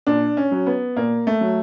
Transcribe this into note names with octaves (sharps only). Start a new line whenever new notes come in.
A#2 D4
C#4
F#3
B3
A#2 A#3
A3
F#3